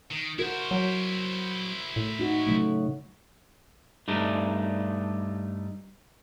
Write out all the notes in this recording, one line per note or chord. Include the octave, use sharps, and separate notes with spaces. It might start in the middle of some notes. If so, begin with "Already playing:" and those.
D#3
E4 F#4 A#4 C5
F#3
A2
D#4 F#4
C#3 F#3 A3
G2 G3 A3 D#4